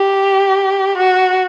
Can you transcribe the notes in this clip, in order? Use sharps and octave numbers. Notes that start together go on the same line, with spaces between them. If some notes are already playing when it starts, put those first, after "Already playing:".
Already playing: G4
F#4